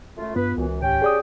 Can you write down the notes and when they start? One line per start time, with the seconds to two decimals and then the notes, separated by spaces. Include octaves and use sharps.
0.18 F#2 A3 F4
0.36 G2 B3 F4 B4
0.58 C#2 F#2 E3
0.82 D#2 G#2 C#4 G4 G5
1.02 G#4 D5 D#6